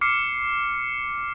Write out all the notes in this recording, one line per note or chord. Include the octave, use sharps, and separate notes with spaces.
D6 F6 C7 C#7